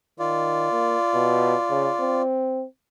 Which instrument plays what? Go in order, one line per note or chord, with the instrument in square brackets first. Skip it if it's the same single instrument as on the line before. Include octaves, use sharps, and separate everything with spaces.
[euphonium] D#3 [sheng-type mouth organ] F4 D5
[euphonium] A#3
B2
C#3
C4